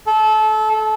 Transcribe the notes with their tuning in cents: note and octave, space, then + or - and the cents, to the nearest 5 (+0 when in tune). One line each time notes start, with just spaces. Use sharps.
A4 -25